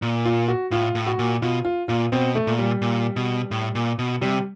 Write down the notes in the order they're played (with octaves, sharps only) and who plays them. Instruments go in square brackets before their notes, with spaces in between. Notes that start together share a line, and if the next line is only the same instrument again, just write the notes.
[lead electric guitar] A#2
[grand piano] F4
F#4
[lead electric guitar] A2 [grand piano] F4
[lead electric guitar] A2
[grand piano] F#4
[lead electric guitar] A#2
[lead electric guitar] B2 [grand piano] F4
[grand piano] F4
[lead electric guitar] A#2 [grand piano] F4
[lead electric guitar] B2 [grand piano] C4
[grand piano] A3
[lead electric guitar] A#2
[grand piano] G3
[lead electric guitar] A#2
B2
A2
A#2
B2
[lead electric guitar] C3 [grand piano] G3